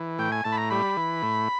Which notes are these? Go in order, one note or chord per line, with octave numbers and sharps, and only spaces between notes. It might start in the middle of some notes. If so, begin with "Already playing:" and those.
Already playing: E3
A2 G5
G#5
A2 A5
B5
A#5
G3 B5
E3
A2